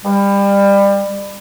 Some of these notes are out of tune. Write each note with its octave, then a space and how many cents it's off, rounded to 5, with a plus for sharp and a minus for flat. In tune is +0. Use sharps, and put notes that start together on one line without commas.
G3 +25